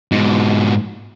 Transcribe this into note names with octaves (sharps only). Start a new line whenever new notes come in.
G#2 B2